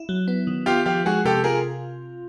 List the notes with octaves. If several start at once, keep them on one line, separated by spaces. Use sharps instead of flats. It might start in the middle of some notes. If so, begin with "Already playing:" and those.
Already playing: E4
F#3
B3
D#3
B3 F4 G4
F3 F4 G4
G#3 F#4 G#4
C3 G4 A4
F4 G#4 A#4